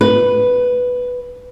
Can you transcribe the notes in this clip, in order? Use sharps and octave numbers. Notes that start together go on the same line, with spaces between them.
B4